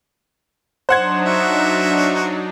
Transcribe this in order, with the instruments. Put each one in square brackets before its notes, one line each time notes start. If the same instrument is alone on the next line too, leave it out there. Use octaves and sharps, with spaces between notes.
[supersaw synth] F#3 D4 D#4 [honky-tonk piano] C5 F#5 G#6
[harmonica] F#4 E5